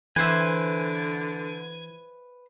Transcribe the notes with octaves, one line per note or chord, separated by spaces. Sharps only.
D3 E3 B4 C5 E5 G#5